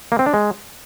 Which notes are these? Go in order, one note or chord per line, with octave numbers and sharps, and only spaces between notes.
A#3
C4
D4
G#3